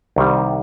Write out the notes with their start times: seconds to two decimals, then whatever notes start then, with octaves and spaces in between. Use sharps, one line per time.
0.16 C2 C3 D#3 G3